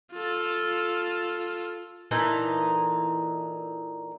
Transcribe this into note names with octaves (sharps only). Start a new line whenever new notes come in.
F4 A4
A#2 E3 D#4 A4